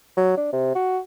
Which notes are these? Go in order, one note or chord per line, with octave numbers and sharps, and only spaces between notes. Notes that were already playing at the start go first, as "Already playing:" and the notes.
F#3
D4
C3
F#4